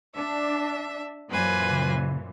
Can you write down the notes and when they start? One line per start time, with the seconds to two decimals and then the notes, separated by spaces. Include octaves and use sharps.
0.15 D4 E5
1.31 F#2 A#2 E3 B4 C5 G#5
1.72 C#3